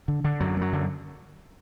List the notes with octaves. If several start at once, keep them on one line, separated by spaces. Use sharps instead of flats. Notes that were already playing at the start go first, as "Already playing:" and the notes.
D3
D3
F#2 F#3
F#2 F#3
D3